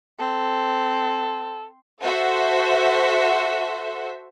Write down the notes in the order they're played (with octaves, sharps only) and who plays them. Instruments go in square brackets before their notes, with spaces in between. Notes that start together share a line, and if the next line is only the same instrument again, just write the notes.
[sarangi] C4 [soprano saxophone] A4
[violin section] F#4 A4 C5 E5